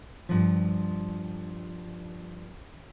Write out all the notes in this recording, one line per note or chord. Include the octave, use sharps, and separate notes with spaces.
G2 F3